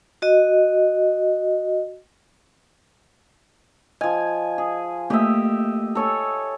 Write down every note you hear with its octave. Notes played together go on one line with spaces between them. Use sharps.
F#4 D#5
F3 D#5 G#5
G#4
A3 A#3 G4 D#5 E5
A4 C#5 G#5